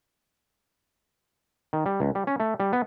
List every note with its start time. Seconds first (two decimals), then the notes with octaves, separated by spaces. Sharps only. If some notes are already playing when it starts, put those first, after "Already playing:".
1.73 D#3
1.86 G3
2.00 C#2
2.15 G3
2.27 C#4
2.40 A3
2.60 G3
2.73 B3